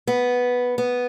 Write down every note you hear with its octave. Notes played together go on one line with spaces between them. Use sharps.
B3
B3